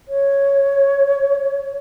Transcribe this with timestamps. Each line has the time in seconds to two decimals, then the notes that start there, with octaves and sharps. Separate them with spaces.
0.08 C#5